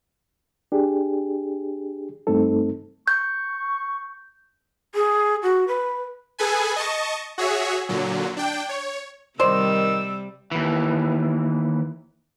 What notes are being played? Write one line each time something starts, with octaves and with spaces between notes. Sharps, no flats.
D4 G4 G#4
G2 A3 C4 D#4 A4
C#6 G6
G#4
F#4
B4
G#4 A4 B4 G#5
D#5 A5 C#6
F#4 G#4 C#5 E5
A#2 D3 F#3
D4 G5
C#5
C3 D#3 G3 C5 D5 E6
D#2 E3